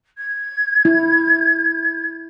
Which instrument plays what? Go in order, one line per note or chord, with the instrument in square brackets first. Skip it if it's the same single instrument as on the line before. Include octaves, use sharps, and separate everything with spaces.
[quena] G#6
[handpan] E4